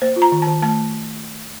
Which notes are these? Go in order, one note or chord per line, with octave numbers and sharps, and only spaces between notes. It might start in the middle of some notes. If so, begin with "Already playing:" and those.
A#3 C5
F4
A#5
D#3
A5
D#3
A3 A5